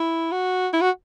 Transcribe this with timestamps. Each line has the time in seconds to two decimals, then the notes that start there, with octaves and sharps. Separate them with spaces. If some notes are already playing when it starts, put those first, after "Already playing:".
Already playing: E4
0.32 F#4
0.73 E4
0.81 F#4